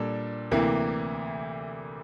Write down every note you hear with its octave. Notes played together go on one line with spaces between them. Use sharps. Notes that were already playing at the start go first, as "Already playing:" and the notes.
Already playing: A#2 G3 D4 A4
D2 C3 E3 A#3